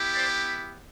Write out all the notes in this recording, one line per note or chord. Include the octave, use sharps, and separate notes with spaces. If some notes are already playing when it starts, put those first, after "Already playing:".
Already playing: B3 E4 G4
C5 D5